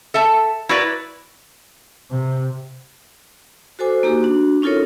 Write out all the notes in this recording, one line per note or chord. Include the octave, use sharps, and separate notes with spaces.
A4 E5 A5
E4 F#4 A#4 B4 D5
C3
F#4 A4 C5 G#5 D6
A#3 D#4 F#4 G4
D4 F#4
C#4 D#4 F4 A4 A#4 C#5